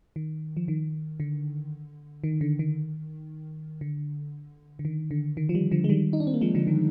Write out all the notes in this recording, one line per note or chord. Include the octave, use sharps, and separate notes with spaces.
D#3
F3
D#3
D3
D#3
D3
D#3
D3
D3
D#3
D3
D#3
F3
D#3 G3
D3 F3
G#3
D#3 G3
D#4
D4
C4
A#3
F3 G#3
D3 F3
D#3